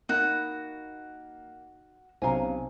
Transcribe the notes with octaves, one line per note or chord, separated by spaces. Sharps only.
A#3 D#4 F#4 B5
B1 C3 C#4 C5 F5 G#5 A#5